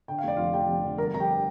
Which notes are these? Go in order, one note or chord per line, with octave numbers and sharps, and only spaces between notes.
D3 G5
F5
F1 D5
F2 F4 F5
F1 G4 G5
F2
D3
G1 A#4 A#5
F2 A#5
G4 G5